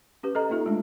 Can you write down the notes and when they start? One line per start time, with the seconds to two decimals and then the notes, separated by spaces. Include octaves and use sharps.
0.23 C#4 G4 B4
0.35 A4 D#5 A#5
0.50 A#3 D#4 F4 A4 E5
0.66 G#3 A3 D4